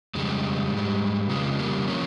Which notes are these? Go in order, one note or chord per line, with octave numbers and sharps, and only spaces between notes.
F2 C#3 G3 G#3
G#2 G3
F2 C#3 F3 G#3
G3 A#3
F3 A#3 C#4